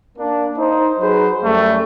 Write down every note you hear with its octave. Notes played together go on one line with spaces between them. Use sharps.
A#3 D4
D#4 C5
F#3 D#4 G#4 B4 C5
F#2 G3 A3